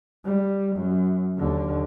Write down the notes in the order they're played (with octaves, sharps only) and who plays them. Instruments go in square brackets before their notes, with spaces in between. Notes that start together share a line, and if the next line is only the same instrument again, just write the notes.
[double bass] G3
F#2
D#2 D3